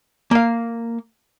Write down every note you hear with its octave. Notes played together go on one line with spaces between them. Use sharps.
A#3 F5